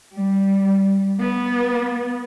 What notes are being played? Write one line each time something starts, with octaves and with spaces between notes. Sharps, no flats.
G3
B3